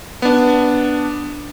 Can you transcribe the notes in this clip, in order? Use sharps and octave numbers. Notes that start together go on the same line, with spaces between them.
B3 D4